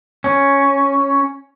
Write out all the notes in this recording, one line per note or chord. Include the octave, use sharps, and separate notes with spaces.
C#4